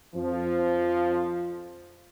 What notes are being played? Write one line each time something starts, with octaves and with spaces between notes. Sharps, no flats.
F2 F3